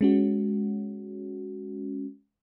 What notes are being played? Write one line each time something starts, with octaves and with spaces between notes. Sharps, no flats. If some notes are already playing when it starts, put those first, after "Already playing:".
G#3 C#4 F#4